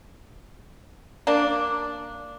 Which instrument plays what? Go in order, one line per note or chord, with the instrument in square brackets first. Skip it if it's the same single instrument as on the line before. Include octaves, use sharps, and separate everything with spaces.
[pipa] A#3 D4